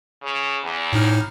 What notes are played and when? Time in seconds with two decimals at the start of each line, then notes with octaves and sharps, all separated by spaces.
0.22 C#3
0.64 E2
0.93 A2 D#4 F6